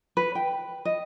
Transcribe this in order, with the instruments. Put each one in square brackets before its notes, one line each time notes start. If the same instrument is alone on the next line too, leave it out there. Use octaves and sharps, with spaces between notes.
[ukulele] B4
G5
D#5